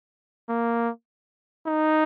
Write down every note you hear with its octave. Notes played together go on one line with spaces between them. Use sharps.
A#3
D#4